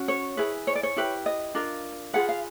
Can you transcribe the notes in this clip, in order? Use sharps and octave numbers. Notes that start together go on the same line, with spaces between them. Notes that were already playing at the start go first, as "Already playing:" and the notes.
Already playing: C#4 F#4
C#5
E4 G#4 B4
C#5
D5
C#5
E4 G4 B4
D#5
D4 F4 A#4
F4 G#4 B4 F#5
F5